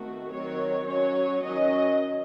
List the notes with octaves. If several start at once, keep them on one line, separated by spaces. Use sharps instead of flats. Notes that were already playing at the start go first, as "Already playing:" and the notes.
Already playing: D#3 A3 C4 F#4
D#3 F#3 C4 C#5
F#3 C#4 C#5
D#3 F#3 C#4 D#5